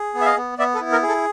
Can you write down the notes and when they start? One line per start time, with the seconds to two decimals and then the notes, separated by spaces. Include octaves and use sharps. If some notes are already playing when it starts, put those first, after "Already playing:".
Already playing: G#4
0.14 B3
0.21 E5
0.25 D#5 F5
0.36 B3
0.58 B3 D5 E5
0.75 A4 B4
0.81 E4
0.92 A#4
1.03 G#4
1.08 A4